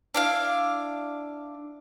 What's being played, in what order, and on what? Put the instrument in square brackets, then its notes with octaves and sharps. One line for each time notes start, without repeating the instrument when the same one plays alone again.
[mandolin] D4 E4 F5